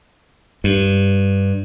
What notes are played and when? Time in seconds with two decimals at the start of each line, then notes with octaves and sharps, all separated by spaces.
0.64 G2